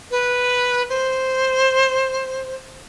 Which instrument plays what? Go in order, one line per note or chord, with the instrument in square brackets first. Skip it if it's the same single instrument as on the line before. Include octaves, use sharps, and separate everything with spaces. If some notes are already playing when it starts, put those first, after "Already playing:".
[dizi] B4
C5